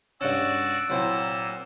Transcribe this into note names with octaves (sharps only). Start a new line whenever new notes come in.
G2 C#4 F#4 D5 F#5 E6
A#2 F#3 C4 E4